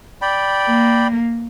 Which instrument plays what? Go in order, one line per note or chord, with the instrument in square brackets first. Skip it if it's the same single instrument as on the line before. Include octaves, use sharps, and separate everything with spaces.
[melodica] D5 G5 B5
[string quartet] A#3